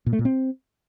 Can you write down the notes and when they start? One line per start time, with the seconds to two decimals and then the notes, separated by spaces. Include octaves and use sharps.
0.06 A#2
0.13 A3
0.19 A#2
0.25 C4